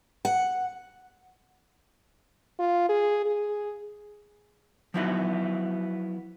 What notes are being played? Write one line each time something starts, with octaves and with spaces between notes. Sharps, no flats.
F#5
F4
G#4
G#4
F3 F#3 B3 D#4 E4 F#4